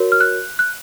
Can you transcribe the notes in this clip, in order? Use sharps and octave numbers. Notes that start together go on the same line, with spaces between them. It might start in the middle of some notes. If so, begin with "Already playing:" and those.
Already playing: F#4 A#4 C#5
F6
F#6
F#6